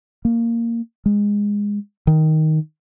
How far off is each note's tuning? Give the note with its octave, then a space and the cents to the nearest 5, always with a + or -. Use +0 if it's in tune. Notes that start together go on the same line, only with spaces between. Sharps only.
A#3 -10
G#3 -15
D#3 +5